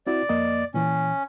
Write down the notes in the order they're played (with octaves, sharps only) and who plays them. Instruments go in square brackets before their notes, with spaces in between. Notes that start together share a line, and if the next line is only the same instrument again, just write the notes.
[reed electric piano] C4 E4 F#4 [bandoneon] D5
[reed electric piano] F2 A#3 D#5
[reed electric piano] A#2 E3 [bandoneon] C#4